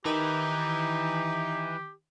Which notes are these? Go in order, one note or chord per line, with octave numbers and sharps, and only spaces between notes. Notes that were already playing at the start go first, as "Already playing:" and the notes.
D#3 E3 D#4 G4